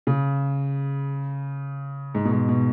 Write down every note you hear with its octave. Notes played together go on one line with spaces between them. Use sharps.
C#3
G#2
B2
G#2
B2